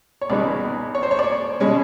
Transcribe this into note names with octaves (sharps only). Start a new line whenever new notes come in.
C#5
C#2 B2 G#3 B3 D#4 D5
C#5
C5
C#5
D5
B2 G#3 C#4